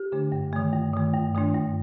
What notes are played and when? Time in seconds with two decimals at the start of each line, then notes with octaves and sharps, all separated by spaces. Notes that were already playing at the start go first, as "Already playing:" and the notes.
Already playing: G4
0.12 D3 A3 D4
0.32 G2
0.53 D#3 A3
0.73 G2
0.94 D#3 A3
1.14 G2
1.34 D#3 A3 D4
1.54 G2